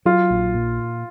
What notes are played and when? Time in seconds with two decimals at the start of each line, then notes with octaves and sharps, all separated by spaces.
0.05 F#3 F4
0.30 A#1
0.55 A#2